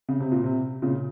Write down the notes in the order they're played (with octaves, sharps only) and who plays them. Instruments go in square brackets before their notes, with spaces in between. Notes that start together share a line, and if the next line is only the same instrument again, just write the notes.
[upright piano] C#3
C3
A#2
C3
A#2 C#3